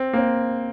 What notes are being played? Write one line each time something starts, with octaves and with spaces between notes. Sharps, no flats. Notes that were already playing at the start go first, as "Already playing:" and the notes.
Already playing: C4
A#3
C4